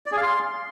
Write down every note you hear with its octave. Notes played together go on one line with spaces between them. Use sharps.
D5
G#4
F5
C6